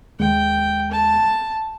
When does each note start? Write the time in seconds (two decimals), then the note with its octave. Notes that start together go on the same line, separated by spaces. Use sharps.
0.20 D#2 G#3 G5
0.91 A5